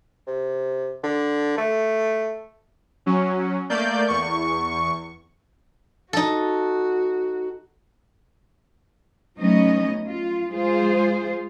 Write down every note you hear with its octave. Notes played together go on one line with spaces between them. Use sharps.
C3
D3
A3
F#3 C#4
A3 A#3 D5 G6
E2 C#6
D#4 F#4 A4
F#3 A3 B3 C#4 D#4 D#5
F4
G#3 F4 G#4 C5